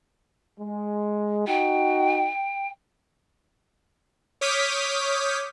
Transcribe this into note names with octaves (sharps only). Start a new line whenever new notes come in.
G#3
D#4 F#4 G5
C#5 D6 D#6 F6 G6 B6